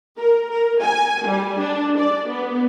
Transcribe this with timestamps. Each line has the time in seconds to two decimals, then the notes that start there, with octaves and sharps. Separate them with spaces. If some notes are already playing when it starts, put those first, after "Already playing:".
0.19 A#4
0.51 A#4
0.83 G#5
1.27 G3
1.59 D4
1.99 D5
2.29 B3